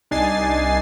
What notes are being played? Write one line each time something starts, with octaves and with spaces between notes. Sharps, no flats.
C2 D4 D#4 G#5 A6 C7